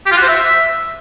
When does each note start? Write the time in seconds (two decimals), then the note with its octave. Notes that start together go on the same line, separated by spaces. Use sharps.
0.06 G4
0.12 F4
0.17 F#4
0.23 C5
0.28 E5